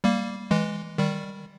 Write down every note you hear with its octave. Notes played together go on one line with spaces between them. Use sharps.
G3 A#3
E3 G#3
D#3 G3